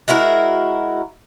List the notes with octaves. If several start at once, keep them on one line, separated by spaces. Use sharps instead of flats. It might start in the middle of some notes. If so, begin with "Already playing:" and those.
G#3 E4 F#4 A#4